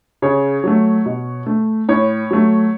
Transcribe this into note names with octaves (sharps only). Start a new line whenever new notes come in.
C#3 C#5
F#3 A3
B2
A3
A2 C#5
F#3 A3